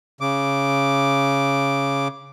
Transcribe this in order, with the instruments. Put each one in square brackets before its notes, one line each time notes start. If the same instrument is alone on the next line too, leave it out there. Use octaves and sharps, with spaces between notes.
[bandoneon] C#3 D6